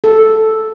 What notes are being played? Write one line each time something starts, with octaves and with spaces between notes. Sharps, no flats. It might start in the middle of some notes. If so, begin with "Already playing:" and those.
A4